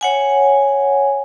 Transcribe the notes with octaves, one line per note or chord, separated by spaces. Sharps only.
C#5 F#5 G#5